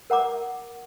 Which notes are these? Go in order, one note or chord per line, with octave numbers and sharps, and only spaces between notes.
A#4 F#5 A#5 D6